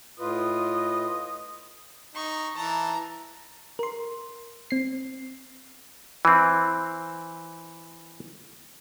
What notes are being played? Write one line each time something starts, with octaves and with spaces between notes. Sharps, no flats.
A2 F4 B4 D#5
D#4 C#6
E3 A5 A#5
A#4 C6
C4 C7
E3 C4